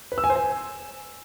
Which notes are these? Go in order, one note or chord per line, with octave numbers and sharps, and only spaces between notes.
B4
E6
G#5
C5
G#5